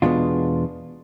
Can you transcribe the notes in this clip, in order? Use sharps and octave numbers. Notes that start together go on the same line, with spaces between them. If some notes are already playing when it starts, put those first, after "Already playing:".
E2 B2 G#3 B3 D4 F4